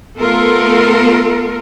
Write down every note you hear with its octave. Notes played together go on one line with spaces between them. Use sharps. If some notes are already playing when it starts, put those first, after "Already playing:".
A3 B3 F4 A4 A#4